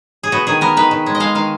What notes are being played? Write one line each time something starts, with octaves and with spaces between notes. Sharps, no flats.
G#4
B3 F#4
D#3 G#4
B3 A#4
D#3 B4
D#3
G#3
D#5
G#3 F5
D#3 F5